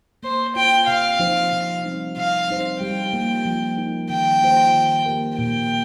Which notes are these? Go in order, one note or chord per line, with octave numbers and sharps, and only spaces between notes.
A#3 C5
F4 C5 G5
C3 F5
F3 D#4 C5
C3
G3 C4 D#4 C5
C3 F5
G3 D#4 C5
G3 G5
A#3 F4
F3
D#4 A#4
D#3 G5
A#3 F4 C5
D#3
A#3 G4 A#4
A#2 G5